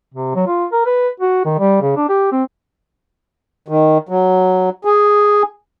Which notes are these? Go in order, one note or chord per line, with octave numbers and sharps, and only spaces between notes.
C3
F#3
F4
A#4
B4
F#4
D#3
G3
C#3
D4
G4
C4
D#3
F#3
G#4